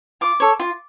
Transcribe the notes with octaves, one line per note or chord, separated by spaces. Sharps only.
F4 D6
A4 C#5
F4